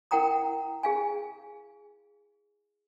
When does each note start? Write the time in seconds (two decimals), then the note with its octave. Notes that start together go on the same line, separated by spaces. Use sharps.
0.11 E4 A#4 F#5 G5 A#5 D#6
0.83 G#4 F5 G#5